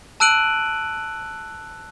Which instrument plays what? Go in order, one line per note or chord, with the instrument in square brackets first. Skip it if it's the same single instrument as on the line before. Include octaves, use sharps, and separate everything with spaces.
[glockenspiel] A5 E6 F#6 D7 D#7 F#7